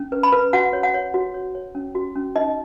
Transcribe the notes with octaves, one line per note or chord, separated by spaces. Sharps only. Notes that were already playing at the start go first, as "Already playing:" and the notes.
Already playing: C#4
B4
B5
B4
F#4 F#5
C#5
F#5
C#5
F#4
C#5
C#5
C#4
F#4
C#4
D#4 D#5